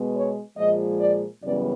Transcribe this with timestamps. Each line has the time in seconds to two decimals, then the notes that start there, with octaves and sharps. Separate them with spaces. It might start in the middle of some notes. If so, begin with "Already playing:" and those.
Already playing: B2 G#3 B3
0.15 C#5
0.57 A#2 F3 G#3 D#5
1.00 D5
1.43 F#2 C#3 E3 G3 B3 D5